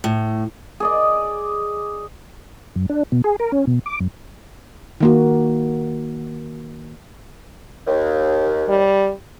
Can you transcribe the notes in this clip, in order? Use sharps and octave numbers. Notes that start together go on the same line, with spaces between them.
A2
G#4 D5 D#5
F#2
D4
B2
G#4
A#4
C#4
B2
D6
F#2
D#3 A#3 F#4
D#2
G3